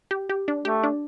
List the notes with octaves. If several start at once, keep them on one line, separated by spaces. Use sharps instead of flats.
G4
G4
D4
A3 G4
D4